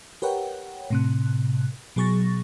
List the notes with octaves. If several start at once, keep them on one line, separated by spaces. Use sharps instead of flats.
G4 A#4 B4 C#5 F#5 G5
A2 C3 F#6
B2 F#3 G#4 C#6 A6 A#6